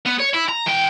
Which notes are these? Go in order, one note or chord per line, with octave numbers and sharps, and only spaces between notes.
B3
C#5
E4
A#5
E3 G5